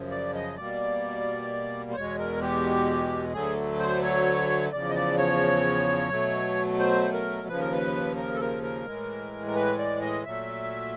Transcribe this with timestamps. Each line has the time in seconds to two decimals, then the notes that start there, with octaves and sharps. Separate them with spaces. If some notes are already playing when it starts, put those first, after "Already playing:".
Already playing: F#2 C#3 F3
0.11 D5
0.35 D#5
0.57 B2 G3 A#3 D5
1.91 C5
1.95 E2 B2 G#3 C#5
2.19 A#4
2.41 G4
3.33 D2 D3 F#3 A3 G#4
3.79 C5
4.03 C#5
4.72 E2 C#3 F3 D5
4.89 D#5
4.95 D5
5.18 C#5
6.10 B2 F#3 A3
6.79 C5
7.13 A#4
7.48 D#2 C#3 F3 B4
7.61 A#4
7.72 B4
8.17 A#4
8.34 A4
8.41 A#4
8.63 A#4
8.86 A2 E3 G#3
9.47 A#4
9.55 B4
9.78 D5
10.02 D#5
10.24 A#2 F#3 A3 E5